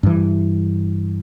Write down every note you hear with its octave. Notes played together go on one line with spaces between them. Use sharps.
G2 E3